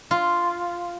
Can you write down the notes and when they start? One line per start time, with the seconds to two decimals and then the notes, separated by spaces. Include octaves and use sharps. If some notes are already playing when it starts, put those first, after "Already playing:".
0.11 F4